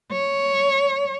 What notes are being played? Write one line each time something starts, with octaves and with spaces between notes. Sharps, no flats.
C#5